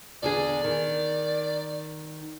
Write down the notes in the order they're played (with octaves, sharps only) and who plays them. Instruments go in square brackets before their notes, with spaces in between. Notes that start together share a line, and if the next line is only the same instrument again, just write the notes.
[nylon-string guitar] E2 D3 G#4 [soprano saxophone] D5
[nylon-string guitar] D#3